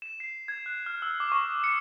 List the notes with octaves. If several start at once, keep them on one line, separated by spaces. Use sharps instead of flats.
E7
C7
G#6
F#6
F6
E6
D6
C#6
D#6
C#7